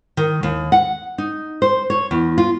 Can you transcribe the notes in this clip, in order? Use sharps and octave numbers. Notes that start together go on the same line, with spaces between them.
D#3
D#2
F#5
D#4
C5
C#5
E2
F4